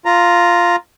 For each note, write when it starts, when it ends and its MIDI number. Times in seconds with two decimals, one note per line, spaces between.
0.06 0.76 65
0.06 0.76 82